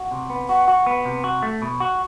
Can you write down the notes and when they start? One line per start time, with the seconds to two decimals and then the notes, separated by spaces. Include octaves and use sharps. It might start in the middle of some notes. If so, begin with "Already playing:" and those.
Already playing: F#4
0.11 C3
0.30 B3
0.48 F#4 F#5
0.68 F#4
0.86 B3
1.05 C3
1.24 F#4
1.43 A3
1.62 B2
1.80 F#4